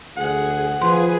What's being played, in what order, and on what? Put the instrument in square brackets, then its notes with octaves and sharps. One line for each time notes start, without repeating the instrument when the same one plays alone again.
[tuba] D2 [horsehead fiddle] G#4 [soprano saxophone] F#5
[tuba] F3 [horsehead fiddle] G#4 B4 [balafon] C6